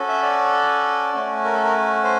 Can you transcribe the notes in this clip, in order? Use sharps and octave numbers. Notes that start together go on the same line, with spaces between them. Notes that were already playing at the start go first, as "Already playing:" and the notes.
Already playing: C#4 F#4 A4
E5
D5
A3 C#4 F#4
A#4
A4
A#4
C5